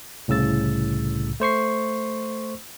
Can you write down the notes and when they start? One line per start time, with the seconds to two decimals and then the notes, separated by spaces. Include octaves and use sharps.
0.28 C2 A2 C#3 E6 A6
1.40 A3 C5 C#6 C7